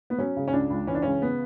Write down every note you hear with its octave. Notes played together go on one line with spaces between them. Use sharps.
B3
F#3 C#4
C#3
C#4
C#2 D4
C#2
E3 C#4
D4
C#3 C#4
B3